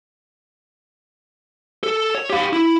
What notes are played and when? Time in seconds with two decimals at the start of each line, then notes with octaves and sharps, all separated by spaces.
1.83 A4
2.15 C#5
2.30 G4 F5
2.53 E4